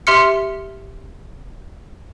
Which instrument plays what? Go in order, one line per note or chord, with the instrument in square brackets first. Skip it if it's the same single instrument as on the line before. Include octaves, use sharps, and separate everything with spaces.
[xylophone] G4 E5 C6 F6 C#7